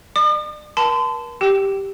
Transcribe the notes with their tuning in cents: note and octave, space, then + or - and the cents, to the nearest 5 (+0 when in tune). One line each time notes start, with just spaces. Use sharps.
D5 +40 D#6 -45
A#4 +45 A5 +0 C6 -40
G4 +0 G5 -20 E6 +0